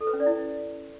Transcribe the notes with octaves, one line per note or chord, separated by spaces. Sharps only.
A4
B4
C#4
D5
E4